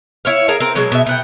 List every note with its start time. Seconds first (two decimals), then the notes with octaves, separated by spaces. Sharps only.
0.25 E4 C#5 F5
0.48 G#4 A#4 F5 A5
0.60 C4 A#4
0.75 B2 F#3 G#3
0.92 B2 E5
1.06 B2 F#5 G5